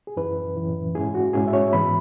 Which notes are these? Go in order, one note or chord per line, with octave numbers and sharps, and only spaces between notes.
G#4
F#2 E3 C#4 E4 B4
F#2 E3 C#4 E4
G#2 G#3 C#4 E4 G#4
F#4
G#2 G#3 C#4 E4 G#4
E5
C#5
G#2 E3 B3 B5